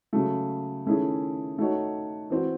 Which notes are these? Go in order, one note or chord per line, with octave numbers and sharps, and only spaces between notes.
C#3 F#3 A3
D#3 A3 C#4 E4 G#4
A3 D#4 F#4 C#5
E3 C4 F#4